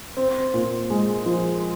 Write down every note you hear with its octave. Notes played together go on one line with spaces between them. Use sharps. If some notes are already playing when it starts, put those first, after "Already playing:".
C4
A#2
G#3
F3